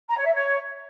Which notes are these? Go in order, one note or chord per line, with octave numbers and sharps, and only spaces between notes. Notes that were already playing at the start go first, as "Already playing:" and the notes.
A#5
C#5
E5
C#5